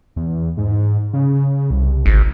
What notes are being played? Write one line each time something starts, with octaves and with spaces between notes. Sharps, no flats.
E2
G#2
C#3
C2
G#1